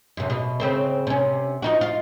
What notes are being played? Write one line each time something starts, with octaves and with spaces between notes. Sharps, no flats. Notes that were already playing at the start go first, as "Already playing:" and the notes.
F#2 C3
B2
C#3 C4 C5
C3 C#4
F3 D#4 F#4
F4